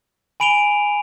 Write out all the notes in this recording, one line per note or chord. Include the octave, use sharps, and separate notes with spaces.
G#5 B5 D7 D#7 F7 G7